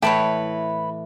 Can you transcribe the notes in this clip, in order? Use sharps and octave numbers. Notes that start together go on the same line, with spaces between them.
A2 E3 E4 B4 C#5 G5 A5 B5